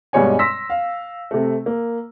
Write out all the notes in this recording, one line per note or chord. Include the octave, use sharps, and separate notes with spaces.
G2 B2 G3 G#3 C#5 G#5
C6 E6 A#6 B6
F5
C3 A3
A#3